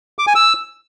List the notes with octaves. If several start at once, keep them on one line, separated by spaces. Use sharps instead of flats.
D6
G#5
E6